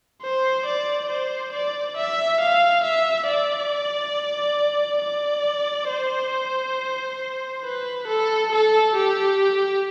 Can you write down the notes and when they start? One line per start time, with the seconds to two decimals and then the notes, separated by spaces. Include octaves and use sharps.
0.22 C5
0.66 D5
1.10 C5
1.53 D5
1.97 E5
2.41 F5
2.84 E5
3.27 D5
5.02 D5
5.89 C5
7.64 B4
8.07 A4
8.52 A4
8.95 G4